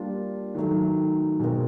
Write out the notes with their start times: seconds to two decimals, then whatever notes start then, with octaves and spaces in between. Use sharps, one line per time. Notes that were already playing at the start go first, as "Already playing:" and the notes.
Already playing: G3 A#3 D4 F4
0.55 D#3 F#3 A3
1.40 B2 G#3 C4 F4 A#4